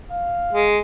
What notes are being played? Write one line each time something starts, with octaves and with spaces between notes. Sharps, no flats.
F5
G#3